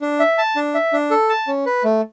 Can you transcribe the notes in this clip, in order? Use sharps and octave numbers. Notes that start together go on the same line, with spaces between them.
D4
E5
A5
D4
E5
D4
A4
A5
C#4
B4
A3